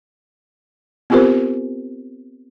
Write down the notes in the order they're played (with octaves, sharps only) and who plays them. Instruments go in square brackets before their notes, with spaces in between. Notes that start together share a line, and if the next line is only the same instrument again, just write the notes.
[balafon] B3 C4 F4 G4 A#4 C5